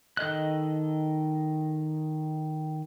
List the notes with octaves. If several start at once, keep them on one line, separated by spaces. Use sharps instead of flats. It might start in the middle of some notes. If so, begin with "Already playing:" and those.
D#3 A4 D#5 F#6